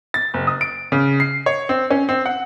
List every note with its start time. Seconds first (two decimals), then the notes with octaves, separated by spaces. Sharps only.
0.14 A6
0.34 F#1
0.47 D#6
0.61 D7
0.92 C#3
1.20 C7
1.46 C#5
1.69 C4
1.90 C#4
2.09 C4
2.26 F#5